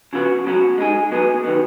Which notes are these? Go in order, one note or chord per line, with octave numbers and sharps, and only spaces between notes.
C#3 F3 B3 F#4
B2 F#3 C#4 F#4
G#3 D#4 G#4
F#3 B3 D#4 G#4
D#3 F#3 B3